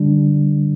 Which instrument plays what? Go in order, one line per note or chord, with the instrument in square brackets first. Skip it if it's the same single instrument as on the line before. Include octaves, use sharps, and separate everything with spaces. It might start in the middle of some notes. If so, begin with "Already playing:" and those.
Already playing: [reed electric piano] D3 G3 D4